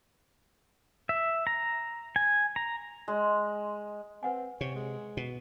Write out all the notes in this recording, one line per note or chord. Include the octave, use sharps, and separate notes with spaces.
E5
A#5
G#5
A#5
G#3
C4 B4 F#5 G#5
C3 C#5
G#3
B2